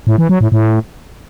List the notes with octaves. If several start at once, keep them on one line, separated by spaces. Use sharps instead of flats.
A2
E3
F#3
A2
A2